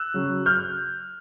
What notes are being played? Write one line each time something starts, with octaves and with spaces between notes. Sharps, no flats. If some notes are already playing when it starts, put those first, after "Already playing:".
Already playing: E6 F#6
C#3 F#3
F6 G6